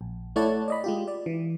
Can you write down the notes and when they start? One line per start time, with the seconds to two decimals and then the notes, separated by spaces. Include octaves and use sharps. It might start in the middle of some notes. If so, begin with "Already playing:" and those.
0.01 A#1
0.36 A3 E4 C#5 D5 F#5 A5
0.68 D5 D#5 B5
0.84 G#3 F4 G4
1.08 D5
1.26 E3